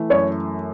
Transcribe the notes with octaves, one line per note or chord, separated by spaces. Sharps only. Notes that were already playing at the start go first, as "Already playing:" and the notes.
Already playing: E3 A3
F#2 C#5